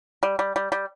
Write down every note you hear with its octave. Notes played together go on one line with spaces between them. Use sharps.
G3
G3
G3
G3